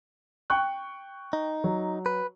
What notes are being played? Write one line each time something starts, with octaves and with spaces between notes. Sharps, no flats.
G5 C#6 F#6
D#4
F#3
B4